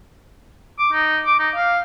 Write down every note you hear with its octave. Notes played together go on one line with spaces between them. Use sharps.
D6
D#4
D6
D#4
F5